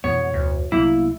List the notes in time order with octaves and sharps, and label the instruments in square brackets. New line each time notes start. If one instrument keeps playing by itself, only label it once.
[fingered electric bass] F2 B2 E3 [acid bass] B3 [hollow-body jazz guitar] C#5
[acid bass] D2
[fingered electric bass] C2 F#3 B3 [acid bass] A#3 [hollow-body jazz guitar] E4